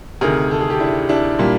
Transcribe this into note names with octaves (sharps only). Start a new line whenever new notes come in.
D2 C3 D#3 G#4 A#4
A4
G#4
G4 A4
D4 E4
D4 E4
A#2 G3 A#3